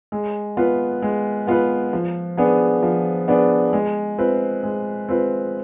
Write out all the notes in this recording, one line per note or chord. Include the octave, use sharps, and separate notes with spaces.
G#3
B3 F4 B4
G#3
B3 F4 B4
F3
B3 D4 G#4
F3
B3 D4 G#4
G#3
C4 F4 B4
G#3
C4 F4 B4